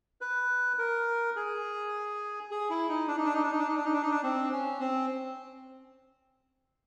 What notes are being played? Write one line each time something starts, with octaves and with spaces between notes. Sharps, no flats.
B4
A#4
G#4
G#4
E4
D#4
D4
D#4
D4
D#4
D4
D#4
D4
D#4
D4
D#4
D4
D#4
D4
C4
C#4
C4